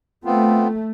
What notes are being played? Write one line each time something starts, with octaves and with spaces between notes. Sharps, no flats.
A3 B3 C4 F4